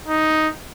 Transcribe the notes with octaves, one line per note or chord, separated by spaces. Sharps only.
D#4